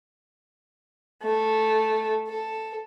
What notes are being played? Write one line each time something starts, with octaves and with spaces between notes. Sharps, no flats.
A3
A4